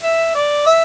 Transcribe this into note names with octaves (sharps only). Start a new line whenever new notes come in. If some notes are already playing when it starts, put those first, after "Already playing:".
E5
D5
E5